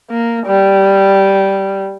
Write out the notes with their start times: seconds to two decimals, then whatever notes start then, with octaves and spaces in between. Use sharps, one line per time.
0.10 A#3
0.47 G3